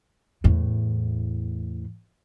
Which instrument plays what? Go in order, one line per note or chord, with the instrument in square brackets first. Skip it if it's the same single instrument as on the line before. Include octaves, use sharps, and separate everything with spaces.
[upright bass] E2 A2